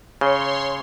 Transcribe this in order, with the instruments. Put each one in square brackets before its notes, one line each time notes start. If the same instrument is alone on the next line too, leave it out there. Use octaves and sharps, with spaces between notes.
[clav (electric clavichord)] C#3 [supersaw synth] C#5 C6